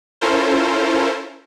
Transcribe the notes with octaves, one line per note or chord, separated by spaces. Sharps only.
C#4 E4 F4 A4 A#4 C5